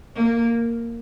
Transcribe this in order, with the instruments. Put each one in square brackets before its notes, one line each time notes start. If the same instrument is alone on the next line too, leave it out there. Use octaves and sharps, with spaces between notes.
[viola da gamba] A#3